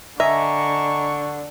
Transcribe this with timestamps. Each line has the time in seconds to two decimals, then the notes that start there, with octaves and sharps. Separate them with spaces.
0.20 D3 D#5 E5 G#5 A#5 C#6